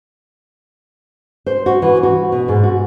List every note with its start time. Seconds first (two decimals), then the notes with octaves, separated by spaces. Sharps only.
1.46 C5
1.66 F#4
1.82 E3
2.03 F#4
2.32 B2
2.48 G#2
2.63 F#4